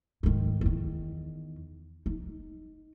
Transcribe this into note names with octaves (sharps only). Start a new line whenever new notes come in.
G#2 D#3
E2 D#3
D#4